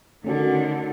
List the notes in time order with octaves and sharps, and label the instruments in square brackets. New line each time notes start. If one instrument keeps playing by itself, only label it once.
[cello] D3 D#3 [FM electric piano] A3 C#4 F#4